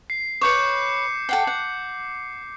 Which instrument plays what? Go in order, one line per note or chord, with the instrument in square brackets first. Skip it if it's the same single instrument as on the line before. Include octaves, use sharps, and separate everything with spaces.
[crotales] C7
[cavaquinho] B4 C#5 [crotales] D6 G6 C#7
[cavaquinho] A4 F#5 G5 [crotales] C7
[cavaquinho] F#5